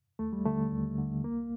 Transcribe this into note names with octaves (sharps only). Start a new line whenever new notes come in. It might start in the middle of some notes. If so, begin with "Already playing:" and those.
D#2 A3
G3
D3 A3
D#2
D3
C2 A#3